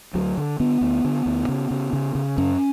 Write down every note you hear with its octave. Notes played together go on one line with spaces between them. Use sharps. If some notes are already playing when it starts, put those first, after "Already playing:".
D2 F#3
D3
D3 B3
D2
D3
D2
C#3
C#3
C#3
C#3
F#2 C#4